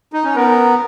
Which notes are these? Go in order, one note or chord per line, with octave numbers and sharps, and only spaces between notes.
D#4
C#4
B3 A#4